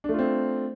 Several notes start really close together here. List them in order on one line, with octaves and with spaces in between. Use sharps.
D4 A3 F4 C4